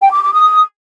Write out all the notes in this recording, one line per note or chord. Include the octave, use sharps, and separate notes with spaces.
G5
D6
D6
D#6